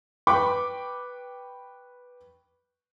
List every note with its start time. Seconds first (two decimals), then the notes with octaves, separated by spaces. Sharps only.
0.27 B4 G5 B5 C#6 D6